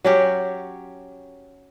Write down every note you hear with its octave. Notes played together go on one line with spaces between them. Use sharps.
F#3 C#4 G4